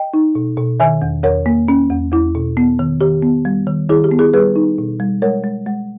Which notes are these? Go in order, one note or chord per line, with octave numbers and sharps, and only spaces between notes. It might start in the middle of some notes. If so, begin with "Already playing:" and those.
Already playing: D#5 G5
D#4
B2
B2
D#3 E5 G#5
E2
E2 A#4 C#5
A#3
C#4
E2
E2 E4
B2
B3
D#3
D#3 G4
B3
G3
D#3
D#3 E4 G#4
G4
B3
E4 G#4
G3 G#4 B4
D#4
B2
G3
G#3 A#4 C#5
G#3
G#3